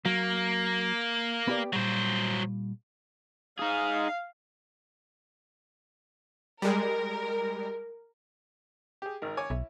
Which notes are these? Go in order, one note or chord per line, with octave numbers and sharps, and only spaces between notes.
F#3 A#3
B3 G4 D5
A#2 F#3 G3 C5
D#4 G#4 F5
G3 G#3 A#4
G4 G#4
G#1 D#3 A#4
C#5 G#5 D6
B1 E4